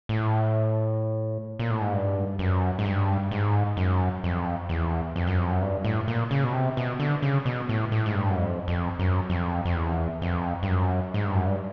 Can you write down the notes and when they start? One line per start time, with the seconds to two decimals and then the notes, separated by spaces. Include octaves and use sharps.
0.09 A2
1.59 A#2
1.71 A2
1.82 G#2
1.93 G2
2.39 F#2
2.79 G#2
2.85 G2
3.31 G#2
3.77 F#2
4.24 F2
4.69 E2
5.16 F2
5.27 F#2
5.38 F2
5.51 F#2
5.61 G2
5.84 A2
6.08 A#2
6.31 C#3
6.44 B2
6.54 C3
6.77 B2
6.99 D3
7.22 C#3
7.45 B2
7.69 A2
7.92 A2
8.06 G#2
8.15 G2
8.30 F#2
8.38 F2
8.68 F2
8.99 F#2
9.30 F2
9.65 F2
9.76 E2
10.22 F2
10.63 G2
10.68 F#2
11.14 G#2
11.25 G2
11.34 F#2
11.46 G2